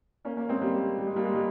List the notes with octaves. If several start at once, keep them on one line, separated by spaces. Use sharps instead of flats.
A#3 C#4
A#3 C#4
G#3 C4
G3 A#3
G3
G#3
G3 A#3
G#3
G3